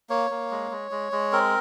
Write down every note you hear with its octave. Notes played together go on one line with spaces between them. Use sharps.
A#3 C#5
A#3
G#3
G#3
G#3
G#3
C4 A#4